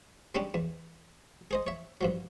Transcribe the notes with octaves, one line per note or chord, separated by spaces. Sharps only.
G3 G#3 C#4 D4 G4
E2
G#4 C5 D#5
C#5 E5
G2 F3 F#3